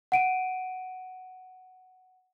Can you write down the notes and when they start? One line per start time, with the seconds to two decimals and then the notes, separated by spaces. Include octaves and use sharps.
0.12 F#5 D7 D#7